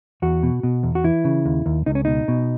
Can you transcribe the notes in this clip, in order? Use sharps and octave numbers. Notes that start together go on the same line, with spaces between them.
E2 F#4
B2
B2
E2
F#4
E3 E4
C#3
D#2
D#2
C#2 D#4
C#4
B2 D#4
B2